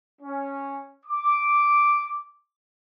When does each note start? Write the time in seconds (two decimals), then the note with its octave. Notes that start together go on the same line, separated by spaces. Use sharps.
0.22 C#4
1.05 D6